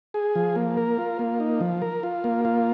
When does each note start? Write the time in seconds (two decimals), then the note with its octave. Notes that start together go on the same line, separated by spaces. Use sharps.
0.14 G#4
0.35 F3
0.56 A#3
0.77 A#4
0.98 F4
1.19 A#3
1.40 D#4
1.61 F3
1.82 A#4
2.03 F4
2.24 A#3
2.45 F4